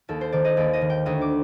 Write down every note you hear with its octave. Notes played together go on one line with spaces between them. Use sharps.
D#2 A4
C5
D#3 D5
D#5
D#2 D5
D#5
D#3
G5
D2 D#6
D6